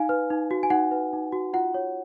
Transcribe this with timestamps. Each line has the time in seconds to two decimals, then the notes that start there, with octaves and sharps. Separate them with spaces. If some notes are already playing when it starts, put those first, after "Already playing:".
Already playing: D#4 F5 G#5
0.09 B4
0.30 D#4
0.51 F#4
0.63 G#5
0.70 D#4 F#5
0.91 B4
1.13 D#4
1.32 F#4
1.53 F4 F#5
1.74 C#5